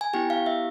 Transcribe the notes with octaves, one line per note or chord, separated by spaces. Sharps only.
G#5
B3 E4 G4 G5
F5
E5